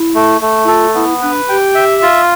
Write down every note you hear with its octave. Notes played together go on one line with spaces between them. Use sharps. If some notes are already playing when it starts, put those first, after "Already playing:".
Already playing: E4
A3
A3
E4
F4 A4
B3 E4
D4 B4
G4 G5
E5
F4